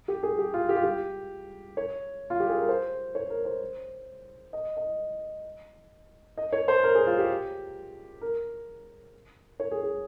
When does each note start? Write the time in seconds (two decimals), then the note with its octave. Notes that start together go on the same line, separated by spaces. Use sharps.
0.08 G4
0.23 G#4
0.38 G4
0.54 F4
0.69 G4
0.76 F4
0.83 G4
1.77 C#5
2.30 F4
2.40 G4
2.49 G#4
2.59 A#4
2.69 C5
3.15 C#5
3.30 A#4
3.45 C5
4.53 D#5
4.77 D#5
6.37 D#5
6.53 C#5
6.68 C5
6.84 A#4
6.95 G#4
7.07 F4
7.18 G4
8.22 A#4
9.60 C#5
9.71 G#4
9.83 G#4